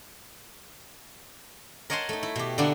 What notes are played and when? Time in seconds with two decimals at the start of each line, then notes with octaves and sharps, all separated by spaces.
1.90 A#4 C#5 D#5 F#5 A5 C6
2.09 A3 D#4
2.23 E4
2.36 B2 G4
2.58 D3 A#3 B3 D4